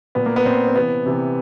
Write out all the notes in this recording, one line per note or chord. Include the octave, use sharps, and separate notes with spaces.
A#2 B3
A#3
B3
A#2 C4
C4
C3 E3 B3
C3 E3